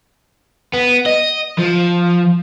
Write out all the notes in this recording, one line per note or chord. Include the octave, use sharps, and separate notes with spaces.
B3
D#5
F3